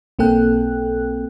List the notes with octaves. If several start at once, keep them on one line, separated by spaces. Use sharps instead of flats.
B1 A#3 C4 A4 G5 F#6